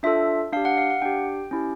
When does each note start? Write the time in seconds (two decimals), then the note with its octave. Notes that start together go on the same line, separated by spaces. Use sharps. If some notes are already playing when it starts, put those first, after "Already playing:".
0.03 D4 F4 A4 E5
0.53 D4 F5
0.57 G4
0.65 F#5
0.78 F5
0.90 F#5
1.02 D4 G4 G5
1.51 C#4 E4 G4